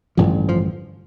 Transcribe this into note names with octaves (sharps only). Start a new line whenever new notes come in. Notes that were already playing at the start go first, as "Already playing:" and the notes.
A1 G2 D3 F3
F3